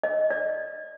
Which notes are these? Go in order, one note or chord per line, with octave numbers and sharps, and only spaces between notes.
D#5
D5